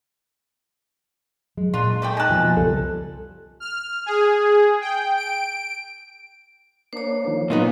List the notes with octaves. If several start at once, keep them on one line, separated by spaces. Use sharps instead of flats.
F#3 G#3
A#2 D4 F4
A3 D5 G5
D#4 G#5 A5 F#6
B2 F3 A#3
C2 F#2 C#3 G3 A4
F6
G#4
G5
D7
A#3 D4 C5 C#5
D#3 F3 A#3
A#2 D#3 F#3 B3 C#4 D#4 F4